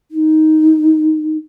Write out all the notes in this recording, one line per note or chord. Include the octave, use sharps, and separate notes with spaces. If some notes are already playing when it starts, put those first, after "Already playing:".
D#4